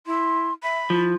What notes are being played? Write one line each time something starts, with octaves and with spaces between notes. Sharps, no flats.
E4 C6
E5 B5
F3 E4